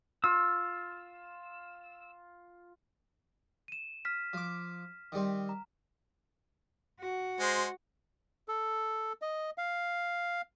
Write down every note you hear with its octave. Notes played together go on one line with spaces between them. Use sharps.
F4 E6
D#7 E7
F6 B6
F3 D6
D#3 G3 C4
A#5
F#4
G#3 C5
A4
D#5
F5